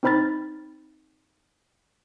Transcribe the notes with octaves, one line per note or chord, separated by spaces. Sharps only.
C4 D#4 C5 B5 F6 A6